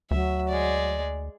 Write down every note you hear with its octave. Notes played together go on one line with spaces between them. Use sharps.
D2 F#3 E5
G#3 D5